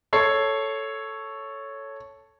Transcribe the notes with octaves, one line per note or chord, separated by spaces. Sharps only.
A4 C#5 C7